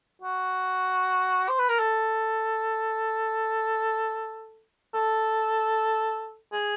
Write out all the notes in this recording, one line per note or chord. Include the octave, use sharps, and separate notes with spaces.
F#4
C5
B4
A#4
A4
A4
G#4